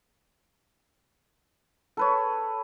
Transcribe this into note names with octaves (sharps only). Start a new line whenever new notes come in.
A4 B4 C#5